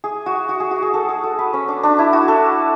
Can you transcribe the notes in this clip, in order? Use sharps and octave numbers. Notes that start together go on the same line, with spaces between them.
G#4
F#4
F#4
G#4
F#4
G#4
A4
G#4
A4
B4
C#4
D4
D4
E4
F#4
A4